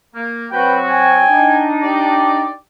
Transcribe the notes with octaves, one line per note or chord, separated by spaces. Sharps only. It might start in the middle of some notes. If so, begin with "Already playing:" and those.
A#3
F#3 C4 F#4 B4 G5
G5 G#5
D4 D#4
G4 D5